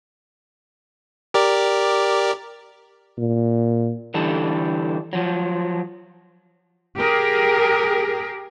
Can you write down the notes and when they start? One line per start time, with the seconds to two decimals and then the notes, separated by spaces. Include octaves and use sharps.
1.34 G4 A#4 D5
3.18 A#2
4.14 D3 E3 G3 A4
5.13 F3 F#3
6.97 G4 G#4 A#4